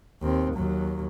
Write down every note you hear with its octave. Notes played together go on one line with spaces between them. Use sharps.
D#2 C4
D#2 F#3